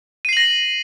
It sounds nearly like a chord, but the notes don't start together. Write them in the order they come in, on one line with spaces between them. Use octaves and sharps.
D#7 C7 F#7 A#6